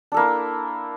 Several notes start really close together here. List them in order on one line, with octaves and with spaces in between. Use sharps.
D4 A4 A#3 E4